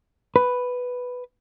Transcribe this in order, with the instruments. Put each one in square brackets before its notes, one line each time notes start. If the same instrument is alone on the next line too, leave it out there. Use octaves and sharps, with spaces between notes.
[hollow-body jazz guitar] B4